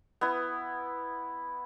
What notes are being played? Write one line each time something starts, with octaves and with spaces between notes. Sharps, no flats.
B3 E4